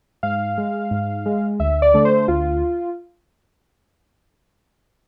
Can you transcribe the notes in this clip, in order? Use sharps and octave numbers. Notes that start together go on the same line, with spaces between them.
G#2 F5
G#3
G#2
G#3
D2 E5
D5
D3 A3
C5
D2 F4